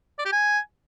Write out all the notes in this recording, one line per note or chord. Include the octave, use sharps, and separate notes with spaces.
D5
G4
G#5